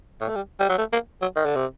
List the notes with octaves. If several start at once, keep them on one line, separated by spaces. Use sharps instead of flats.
A2
A3
G3
G3
F#3
A3
A#3
F#3
D#3
D3
C3